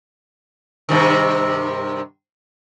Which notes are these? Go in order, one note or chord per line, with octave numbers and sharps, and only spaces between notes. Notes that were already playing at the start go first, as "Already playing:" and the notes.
G2 C3 D#3